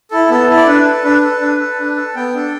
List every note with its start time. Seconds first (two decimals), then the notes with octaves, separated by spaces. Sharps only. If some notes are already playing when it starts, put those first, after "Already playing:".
0.11 E4 A4
0.29 B3 A4
0.49 E4 A4
0.57 D5
0.66 D4 B4
0.85 A4
1.04 D4 B4
1.23 A4
1.41 D4
1.59 A4
1.79 D4
1.96 A4
2.15 B3 G5
2.34 D4 A4